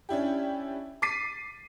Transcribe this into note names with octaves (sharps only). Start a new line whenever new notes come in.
C#4 D4 E4 G4
D6 A6 B6 C7 D#7